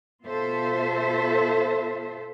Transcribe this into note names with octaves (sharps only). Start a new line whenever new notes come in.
B2 F4 A4 C5 E5